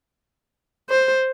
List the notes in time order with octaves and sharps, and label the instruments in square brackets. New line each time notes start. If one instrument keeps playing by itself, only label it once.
[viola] C5